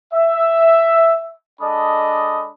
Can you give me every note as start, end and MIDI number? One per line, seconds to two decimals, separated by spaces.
0.13 1.34 76
1.61 2.49 56
1.61 2.49 62
1.61 2.49 69
1.61 2.49 75
1.61 2.49 83
1.61 2.49 87